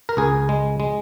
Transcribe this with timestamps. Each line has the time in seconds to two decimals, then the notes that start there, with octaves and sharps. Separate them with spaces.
0.09 A#4
0.17 C#2 G#4
0.49 G#3
0.80 G#3